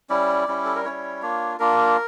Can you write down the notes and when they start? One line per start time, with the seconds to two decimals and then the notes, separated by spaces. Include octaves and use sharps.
0.09 G3 C#4 E4 D5
0.48 G3 C#4 E4
0.65 A4
0.75 A#4
0.85 G3 C#4 E4 C#5
1.22 A#3 D4 F4
1.59 A#3 D4 F4 A#4